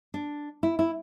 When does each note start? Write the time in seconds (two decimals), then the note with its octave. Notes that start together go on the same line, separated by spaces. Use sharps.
0.14 D4
0.63 E4
0.79 E4